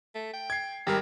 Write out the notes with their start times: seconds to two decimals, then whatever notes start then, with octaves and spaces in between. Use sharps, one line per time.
0.15 A3
0.33 G5
0.50 G#6 C7
0.87 G#1 G3 G4 A#4